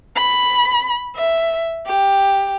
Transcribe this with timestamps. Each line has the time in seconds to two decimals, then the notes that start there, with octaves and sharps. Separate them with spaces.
0.14 B5
1.14 E5
1.86 G4